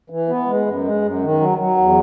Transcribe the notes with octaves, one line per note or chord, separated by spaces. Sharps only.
E3
B3
G#3
F#2
G#3
F#2
D#3
F#3
F#3
E2